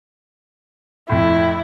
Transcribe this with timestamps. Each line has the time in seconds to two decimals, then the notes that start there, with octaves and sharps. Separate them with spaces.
1.09 F2 A2 E4